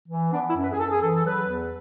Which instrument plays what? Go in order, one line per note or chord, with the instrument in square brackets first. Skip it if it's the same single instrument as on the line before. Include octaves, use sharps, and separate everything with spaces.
[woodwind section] E3
B3 D4
E4
F#2
B4
G#4
F#2 A4
G#4
E3 A4
A4
F#3 B4
E2